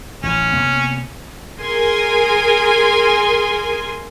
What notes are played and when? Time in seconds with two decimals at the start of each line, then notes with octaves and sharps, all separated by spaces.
0.23 A1 C#4
0.52 C3 A#3 B3
1.61 G#4 A#4 G#5 C6